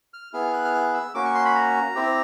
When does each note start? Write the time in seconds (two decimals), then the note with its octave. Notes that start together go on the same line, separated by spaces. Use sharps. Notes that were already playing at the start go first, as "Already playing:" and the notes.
0.14 F6
0.33 B3 E4 G#4 F6
0.53 F#6
0.65 F6
0.74 F#6
0.94 E6
1.15 A#3 C#4 F#4 D6
1.25 C#6
1.35 C6
1.45 B5
1.55 A#5
1.95 C4 E4 G4